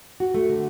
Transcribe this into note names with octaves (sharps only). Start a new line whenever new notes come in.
F#4
A3
D3